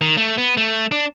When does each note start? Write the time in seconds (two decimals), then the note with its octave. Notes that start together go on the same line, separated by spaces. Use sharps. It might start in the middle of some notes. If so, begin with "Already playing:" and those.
0.01 D#3
0.17 A3
0.38 B3
0.57 A3
0.92 D4